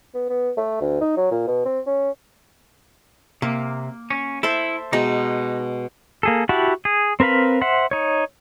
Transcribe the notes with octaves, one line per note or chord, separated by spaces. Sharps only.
B3
B3
A3
D2
D#4
F#3
A#2
B2
C4
C#4
C3 A#3
C#4
E4 A4 C5 E5
B2 G#3 D#4
A#3 G#4 A4
E4 F#4 G4 F#5 A5
G#4
C4 A#4 B4 F5 B5
C5 E5 F#5
D#4 C#5